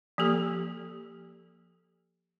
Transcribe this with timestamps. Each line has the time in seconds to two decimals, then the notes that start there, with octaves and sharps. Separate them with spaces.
0.18 F3 A#3 G4 A4